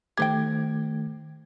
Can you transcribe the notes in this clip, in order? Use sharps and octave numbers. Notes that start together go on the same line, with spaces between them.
D#3 A3 G4 C5 G5 G#6